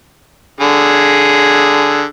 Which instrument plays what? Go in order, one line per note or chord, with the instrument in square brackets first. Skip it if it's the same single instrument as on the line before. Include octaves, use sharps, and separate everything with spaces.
[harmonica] D3 G#4